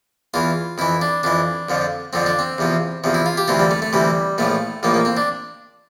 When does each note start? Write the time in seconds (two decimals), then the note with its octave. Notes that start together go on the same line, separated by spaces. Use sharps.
0.34 E2 E3 F4
0.78 F2 E3 E4
1.01 D4
1.23 F2 E3 D4
1.69 F2 D3 F3
2.13 F2 D3 F3 C4
2.26 D4
2.39 C4
2.58 E2 C3 F3
3.04 E2 C3 F3
3.14 E4
3.26 F4
3.37 G4
3.48 D2 C3 E3 F4
3.60 G3
3.71 A3
3.82 A3
3.93 D2 C3 E3 G3
4.38 A#1 A2 F3 A3
4.83 A#1 A2 F3 A#3
4.94 A#3
5.05 C4
5.17 D4